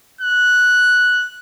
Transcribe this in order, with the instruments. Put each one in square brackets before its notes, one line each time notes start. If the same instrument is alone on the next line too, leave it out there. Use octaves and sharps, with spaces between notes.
[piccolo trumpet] F#6